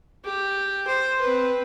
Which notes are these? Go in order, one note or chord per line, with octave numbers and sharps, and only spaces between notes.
G4
C5
C4 B4